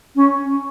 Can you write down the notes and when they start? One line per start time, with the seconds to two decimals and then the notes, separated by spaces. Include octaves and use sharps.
0.16 C#4